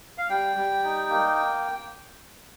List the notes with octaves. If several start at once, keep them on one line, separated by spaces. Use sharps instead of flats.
F5
G3 G5
G3
D#4
A#3